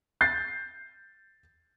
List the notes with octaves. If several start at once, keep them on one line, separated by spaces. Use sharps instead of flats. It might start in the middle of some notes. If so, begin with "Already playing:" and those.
G6 A6 C7